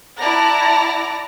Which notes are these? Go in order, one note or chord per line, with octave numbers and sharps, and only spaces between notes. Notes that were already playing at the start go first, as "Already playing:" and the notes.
E4 D5 F#5 A5 A#5 A#6